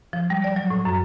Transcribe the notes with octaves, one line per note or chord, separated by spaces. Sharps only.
F3
G3
D5
F#3
A2
F#2